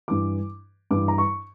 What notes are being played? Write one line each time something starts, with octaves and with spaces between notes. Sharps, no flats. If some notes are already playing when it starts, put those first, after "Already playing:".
G2 E3 D6
G2 E3 D6
A#5
C#6